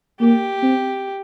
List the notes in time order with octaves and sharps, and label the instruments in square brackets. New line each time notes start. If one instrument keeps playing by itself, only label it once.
[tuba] A#3 [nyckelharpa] G4
[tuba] C4